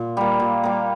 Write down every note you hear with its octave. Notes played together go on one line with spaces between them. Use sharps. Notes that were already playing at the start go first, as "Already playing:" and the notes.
Already playing: A#2
G3 A#3
A#2
G3 A#3